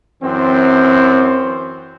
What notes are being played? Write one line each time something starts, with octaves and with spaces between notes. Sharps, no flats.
F#2 E3 C4